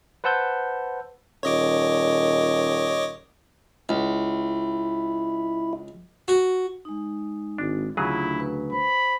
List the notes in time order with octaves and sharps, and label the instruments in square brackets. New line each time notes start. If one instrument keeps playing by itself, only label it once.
[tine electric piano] B4 C5 F#5 A5 E6 G6
[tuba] D#1 [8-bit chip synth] C#5 D#5 D6
[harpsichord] C#2 [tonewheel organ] E4
[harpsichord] F#4
[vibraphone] G#3 D#4
[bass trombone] G#1 [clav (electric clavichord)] D4
[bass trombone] D2 [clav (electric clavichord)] C#3 F#3 G#4 [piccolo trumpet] E4 [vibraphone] F4 G4
[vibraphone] B4
[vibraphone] C5 [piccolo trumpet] B5